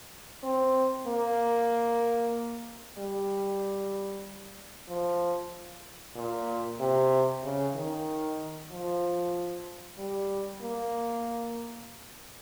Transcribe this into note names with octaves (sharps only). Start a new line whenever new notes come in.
C4
A#3
G3
F3
A#2
C3
C#3
D#3
F3
G3
A#3